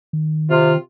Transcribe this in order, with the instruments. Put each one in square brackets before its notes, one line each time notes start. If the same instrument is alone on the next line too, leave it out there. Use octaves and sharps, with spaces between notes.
[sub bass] D#3
[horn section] C3 F4